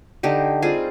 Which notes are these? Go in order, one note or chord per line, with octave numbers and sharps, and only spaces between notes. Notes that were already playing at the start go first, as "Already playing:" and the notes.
D3 D#4 G4
G3 C4 F4 G#4